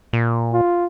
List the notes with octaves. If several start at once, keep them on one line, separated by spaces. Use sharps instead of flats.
A#2
F4